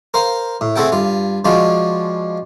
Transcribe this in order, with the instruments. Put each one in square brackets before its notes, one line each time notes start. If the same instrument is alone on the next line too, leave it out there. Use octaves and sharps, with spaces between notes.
[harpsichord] A#4 C5 F5
A2
A3 C4 G#4 A4 F#5 G5
G2 F4
F3 G#3 D4 F4 F#4